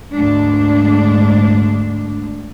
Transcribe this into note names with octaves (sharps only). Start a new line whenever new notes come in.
D2 G#2 D4